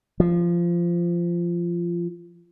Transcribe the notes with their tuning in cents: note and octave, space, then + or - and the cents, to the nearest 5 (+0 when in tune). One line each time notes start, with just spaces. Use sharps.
F3 -15